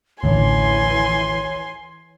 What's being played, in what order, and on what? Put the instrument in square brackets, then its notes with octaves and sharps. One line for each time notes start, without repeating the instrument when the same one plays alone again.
[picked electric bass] A1 D2 [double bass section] E3 [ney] C#5 [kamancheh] G#5 C6